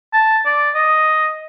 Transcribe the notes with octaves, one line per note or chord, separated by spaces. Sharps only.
A5
D5
D#5